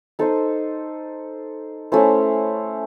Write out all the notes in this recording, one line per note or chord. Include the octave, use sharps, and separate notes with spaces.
D#4 A4 C5 D#5
A3 C#4 E4 C5